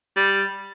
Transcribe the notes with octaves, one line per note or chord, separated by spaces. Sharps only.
G3